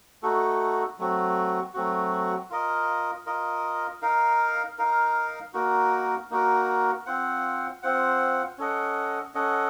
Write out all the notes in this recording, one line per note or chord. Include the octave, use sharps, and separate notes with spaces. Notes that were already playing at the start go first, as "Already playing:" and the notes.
A3 D#4 F#4 A4
F#3 A3 C4 F#4
F#3 A3 C4 F#4
F4 A#4 D#5
F4 A#4 D#5
D#4 A#4 F5
D#4 A#4 F5
A#3 D#4 F#4 A#4
A#3 D#4 F#4 A#4
C4 F4 C5 F#5
C4 F4 C5 F#5
C#4 A4 D#5 F#5
C#4 A4 D#5 F#5